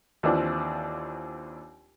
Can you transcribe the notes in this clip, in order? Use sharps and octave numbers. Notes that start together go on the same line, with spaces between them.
D#2 E3 F3 C4 D4